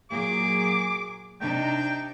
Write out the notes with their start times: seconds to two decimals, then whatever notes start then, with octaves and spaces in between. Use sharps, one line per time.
0.11 A#2 F#3 G#4 D6
1.41 C3 D4 D#4 G5